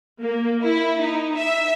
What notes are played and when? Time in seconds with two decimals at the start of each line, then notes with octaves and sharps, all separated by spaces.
0.20 A#3
0.63 E4
0.99 D#4
1.35 E5